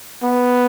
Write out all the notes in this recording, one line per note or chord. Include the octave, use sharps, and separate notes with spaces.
B3